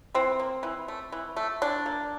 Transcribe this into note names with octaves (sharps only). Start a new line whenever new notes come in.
E3 C4
A#3
E3
A3
E3
A3
E3 D4
A#3